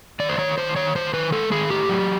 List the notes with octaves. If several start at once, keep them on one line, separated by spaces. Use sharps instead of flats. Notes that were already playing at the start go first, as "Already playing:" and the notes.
D#3 D5
C5
D#3 C#5
D#3 C5
D#3 C#5
D#3 C5
D#3 B4
G#3 A4
D#3 G#4
A2 G4
F#3